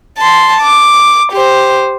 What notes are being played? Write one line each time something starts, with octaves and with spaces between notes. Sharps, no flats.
A5 C6
D6
G4 C5